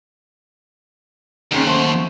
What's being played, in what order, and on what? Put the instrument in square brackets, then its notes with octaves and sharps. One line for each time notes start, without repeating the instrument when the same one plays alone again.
[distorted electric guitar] D#2 [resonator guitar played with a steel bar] D#3 G#3 C#4
[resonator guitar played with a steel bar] F#3 A3 C5